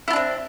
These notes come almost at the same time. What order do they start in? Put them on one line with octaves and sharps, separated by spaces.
E4 F4 D4 C4